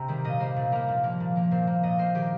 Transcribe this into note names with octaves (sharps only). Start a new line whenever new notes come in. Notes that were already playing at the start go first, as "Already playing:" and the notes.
Already playing: C3 G5 A#5
D#3 G3
A#2 D#5
G3 A#3 C5
A#2
G3 A#3 A#4
A#2
F3 A#3
A#2
F3 A#3
A#2 C5
A#3
A#2 D#5
A#3 C5
D#3 G4